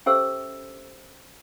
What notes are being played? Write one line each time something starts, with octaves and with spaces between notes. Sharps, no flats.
C#4 G4 A4 C5 E5 E6